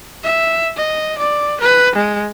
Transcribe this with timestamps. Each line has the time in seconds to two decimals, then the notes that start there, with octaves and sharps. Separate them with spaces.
0.24 E5
0.77 D#5
1.18 D5
1.60 B4
1.96 G#3